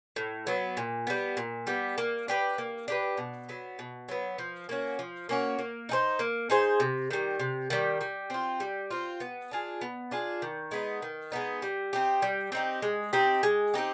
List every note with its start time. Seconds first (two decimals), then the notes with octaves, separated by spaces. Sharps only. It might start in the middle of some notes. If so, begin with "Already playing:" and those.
0.16 A2
0.47 F#3 B3
0.77 A#2
1.07 G3 B3
1.37 A#2
1.67 G3 B3
1.98 A#3
2.28 D4 G4 B4
2.58 A#3
2.88 D4 G4 B4
3.17 B2
3.49 F#3 B3
3.79 B2
4.09 F#3 B3
4.38 F3
4.69 A#3 C#4 F#4
4.99 F3
5.29 A#3 C#4 F#4
5.59 A#3
5.89 D#4 G#4 C5
6.19 A#3
6.50 D#4 G#4 C5
6.80 C3
7.11 D#3 G3
7.39 C3
7.70 D#3 G3
8.01 G3
8.30 C4 F4
8.60 G3
8.90 C4 F4
9.20 B3
9.51 D4 F4 G#4
9.81 B3
10.11 D4 F4 G#4
10.42 D#3
10.71 G#3 B3 D#4
11.02 D#3
11.32 G#3 B3 D#4
11.62 G3
11.93 C4 D#4 G4
12.22 G3
12.52 C4 D#4 G4
12.82 G#3
13.13 C4 D#4 G4
13.43 G#3
13.74 C4 D#4 G4